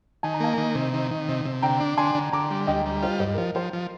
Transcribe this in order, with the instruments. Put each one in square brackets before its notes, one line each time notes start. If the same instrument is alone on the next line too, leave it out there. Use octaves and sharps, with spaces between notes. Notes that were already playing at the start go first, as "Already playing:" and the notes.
[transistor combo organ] D#3 [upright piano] G#5
[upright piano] A#5
[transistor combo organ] A#3 [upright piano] F5 G#5
[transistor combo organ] D#3
C3
D#3
D#3
C3
C3
[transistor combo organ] D3 [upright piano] G5 A#5
[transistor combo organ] D4
[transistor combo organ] D3 [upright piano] G#5 C6
[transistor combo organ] D3
[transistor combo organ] D3 [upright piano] A#5 D6
[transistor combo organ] G3
[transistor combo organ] D2 [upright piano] D#5 G5
[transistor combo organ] G3
[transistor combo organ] F4 [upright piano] C5 D#5
[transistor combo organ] G2 [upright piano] C5 D#5
[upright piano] A#4
[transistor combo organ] F3 [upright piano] C5
[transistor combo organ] F3 [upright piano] C5
[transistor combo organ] F3